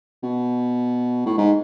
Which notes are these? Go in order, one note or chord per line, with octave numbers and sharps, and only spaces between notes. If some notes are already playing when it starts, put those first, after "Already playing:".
B2
A2
G#2